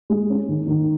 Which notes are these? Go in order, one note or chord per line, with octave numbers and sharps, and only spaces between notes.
G#3
C#4
D#3
D#3